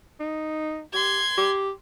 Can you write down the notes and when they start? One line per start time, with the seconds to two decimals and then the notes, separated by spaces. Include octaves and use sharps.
0.20 D#4
0.94 G4 C6 G#6
1.38 G4